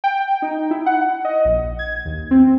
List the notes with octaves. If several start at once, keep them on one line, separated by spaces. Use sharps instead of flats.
G5
D#4
E4
F#5
D#5
A#1
G#6
D#2
C4